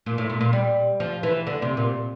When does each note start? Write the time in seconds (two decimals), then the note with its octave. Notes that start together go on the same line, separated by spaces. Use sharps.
0.06 A#2
0.18 A2
0.30 A#2
0.41 A#2
0.53 G3
1.00 F3
1.23 E3
1.47 D3
1.62 C3
1.77 A#2